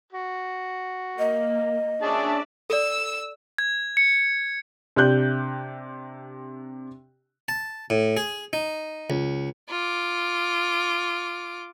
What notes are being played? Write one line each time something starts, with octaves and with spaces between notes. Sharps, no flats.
F#4
A#3 D#5
C#4 D4 G#4 D5 E5 A5
A4 D5 E6
G#6
C#7
C3 D4 G4 F#6 G6
A5
A2
G#4
D#4
C#2
F4 D6